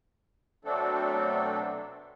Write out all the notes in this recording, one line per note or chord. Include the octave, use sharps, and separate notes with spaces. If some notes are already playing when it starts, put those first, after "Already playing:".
B2 F#3 A3 C4 D4 A4